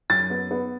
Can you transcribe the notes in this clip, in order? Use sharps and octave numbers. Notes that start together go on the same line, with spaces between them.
F#2 A6
B3
B3